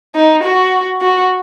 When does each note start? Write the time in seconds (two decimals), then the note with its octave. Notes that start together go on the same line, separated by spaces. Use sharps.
0.15 D#4
0.43 F#4
1.02 F#4